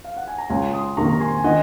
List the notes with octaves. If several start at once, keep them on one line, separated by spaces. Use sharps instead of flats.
F5
F#5
G#5
A#5
C#2 G#5 C6
C6 D#6
C3 D#3 A#3 A#5 C#6
A#5
G#5 C6
G#5
D#3 D#5 F#5